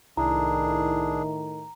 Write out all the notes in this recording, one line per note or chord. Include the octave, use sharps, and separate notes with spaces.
C2 A2 D#3 D4 E4 G#4 A#5